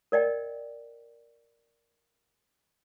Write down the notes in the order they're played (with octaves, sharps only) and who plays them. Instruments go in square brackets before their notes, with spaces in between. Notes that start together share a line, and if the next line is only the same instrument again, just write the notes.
[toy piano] A#4 D5 D#5 G5